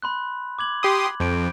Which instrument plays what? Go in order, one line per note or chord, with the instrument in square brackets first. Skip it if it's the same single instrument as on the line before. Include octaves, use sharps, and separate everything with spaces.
[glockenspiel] B5 C6 F#6
D6 G#6 F#7
[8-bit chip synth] G4 C6 D#6
[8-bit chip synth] F2 [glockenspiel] G6 D7